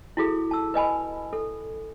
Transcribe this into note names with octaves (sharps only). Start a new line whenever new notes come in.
E4 F#4 G#4 A4
A5 E6
B4 D#5 G#5 B5
A4